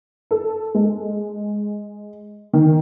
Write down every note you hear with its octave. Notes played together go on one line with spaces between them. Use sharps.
A4
G#3
D#3